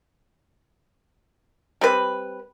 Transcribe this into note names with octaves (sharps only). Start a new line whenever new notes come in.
G3 C4 B4